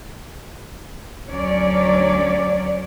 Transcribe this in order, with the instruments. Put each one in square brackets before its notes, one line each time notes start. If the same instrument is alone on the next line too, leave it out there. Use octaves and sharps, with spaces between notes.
[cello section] D2 F#3 C#4 C#5 D5